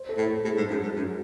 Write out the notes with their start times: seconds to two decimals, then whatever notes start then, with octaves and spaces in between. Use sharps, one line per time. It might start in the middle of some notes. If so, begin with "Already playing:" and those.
Already playing: C5
0.09 A4
0.17 A2
0.27 A4
0.44 A2 G#4
0.57 G#2
0.70 F#2
0.83 G#2
0.96 F#2